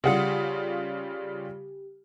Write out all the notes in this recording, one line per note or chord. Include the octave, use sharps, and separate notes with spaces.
C#3 G3 F4 G4 G#4 F#5